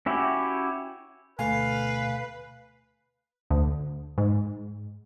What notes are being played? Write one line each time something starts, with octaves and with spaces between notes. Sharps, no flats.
C#4 E4 F#4 G4
D2 B2 A3 B4 F5 G#5
D2
G#2